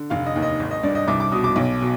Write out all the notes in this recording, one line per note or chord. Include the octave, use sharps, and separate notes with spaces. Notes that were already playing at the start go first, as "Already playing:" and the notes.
Already playing: D3
F1 F5
D#5
D#2
D#5
G#1
D#5
G2 D5
D#5
C2 D6
D6
B2 D#6
D6
B1
B2